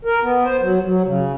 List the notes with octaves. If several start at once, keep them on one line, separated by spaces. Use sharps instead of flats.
A#4
B3
C5
F#3
F#3
C#3